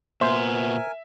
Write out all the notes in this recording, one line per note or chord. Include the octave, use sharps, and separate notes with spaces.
A#2 B3 A#4 C5 E5 G#5